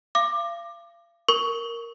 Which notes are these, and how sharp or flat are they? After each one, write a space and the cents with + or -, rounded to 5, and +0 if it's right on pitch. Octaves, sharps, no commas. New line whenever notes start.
F5 -35 D6 +20
A#4 +0 C#6 +15